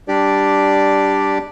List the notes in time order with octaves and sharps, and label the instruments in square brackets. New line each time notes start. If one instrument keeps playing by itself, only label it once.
[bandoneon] G3 D4 G4 D5